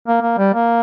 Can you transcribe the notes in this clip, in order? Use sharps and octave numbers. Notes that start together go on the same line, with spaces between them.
A#3
A#3
G3
A#3